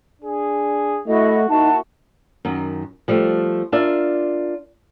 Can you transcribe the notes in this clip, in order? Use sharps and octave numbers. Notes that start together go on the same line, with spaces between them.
D4 G#4
A3 E4 F#4 D#5
A#3 D#4 E4 F#4 A5
F#2 D#3
F3 G3 A3
D4 F4 A#4 D5 E5